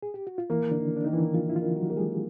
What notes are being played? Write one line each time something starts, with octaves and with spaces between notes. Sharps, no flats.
G#4
G4
F#4
F4
E3 A#3 E4
D3 D4
D#3
D4
D#3 D#4
E3 E4
F3 A#3 F4
E4
F3 F4
D#3
F#3 F#4
A#3 G4
G#3 G#4